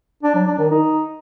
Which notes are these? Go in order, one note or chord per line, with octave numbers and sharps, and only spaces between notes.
D4
F#3
D4
D#3
D#4